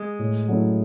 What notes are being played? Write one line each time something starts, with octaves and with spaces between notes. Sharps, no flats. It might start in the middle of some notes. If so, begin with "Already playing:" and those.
Already playing: G#3
A2
F#3 A3 C#4 E4